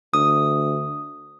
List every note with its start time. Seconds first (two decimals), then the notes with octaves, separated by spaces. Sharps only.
0.14 D2 D#6